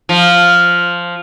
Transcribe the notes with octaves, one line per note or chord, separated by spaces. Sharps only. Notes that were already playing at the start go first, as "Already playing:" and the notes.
F3